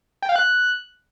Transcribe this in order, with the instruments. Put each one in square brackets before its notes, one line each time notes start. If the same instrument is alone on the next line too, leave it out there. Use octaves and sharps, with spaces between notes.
[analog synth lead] G5
F5
F#6